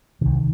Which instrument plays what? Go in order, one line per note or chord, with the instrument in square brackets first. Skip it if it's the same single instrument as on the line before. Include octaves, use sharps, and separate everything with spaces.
[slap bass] C2 C3 D#3